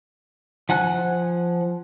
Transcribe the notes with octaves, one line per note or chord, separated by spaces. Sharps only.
F3 F#5 G#5 F#6